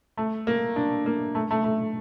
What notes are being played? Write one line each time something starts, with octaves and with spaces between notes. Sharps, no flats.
A3
A#3
D4
A#3
A3
A3
A3